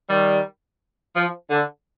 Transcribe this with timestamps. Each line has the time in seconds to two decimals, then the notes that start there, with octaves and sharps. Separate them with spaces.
0.09 D#3 G3
1.16 F3
1.50 D3